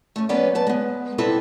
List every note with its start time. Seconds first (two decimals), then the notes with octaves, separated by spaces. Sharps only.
0.16 A3 C#4
0.29 F#3 A#3 B3 C#4 B4 D5
0.55 F#3 B4 A5
0.67 G#3 B3
1.18 C3 G3 C4 E4 A4 B4